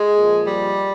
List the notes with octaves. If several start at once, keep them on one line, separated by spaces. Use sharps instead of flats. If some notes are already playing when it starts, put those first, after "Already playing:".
Already playing: G#3
A#2 F3
G3